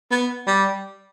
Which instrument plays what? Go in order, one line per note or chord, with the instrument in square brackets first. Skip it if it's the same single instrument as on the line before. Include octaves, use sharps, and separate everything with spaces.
[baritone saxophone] B3
G3